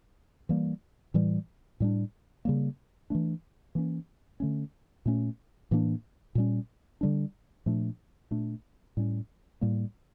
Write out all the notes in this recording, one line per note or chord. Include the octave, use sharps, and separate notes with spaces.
E3 G3 A#3
A2 E3 G3
A2 G3 D4
C#3 G3 A#3
E3 A3 D4
E3 A#3 C#4
D3 A3 C#4
A#2 A3 C#4
A2 E3 A#3 D4
A#2 G3 C#4
D3 G3 D4
A#2 F3 A3 D4
A#2 A3 D4
A2 G3 C#4
A2 G3 A#3